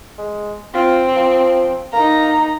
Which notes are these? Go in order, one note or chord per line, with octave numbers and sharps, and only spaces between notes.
G#3
C4 F4
F3
A#3 D#4 A#5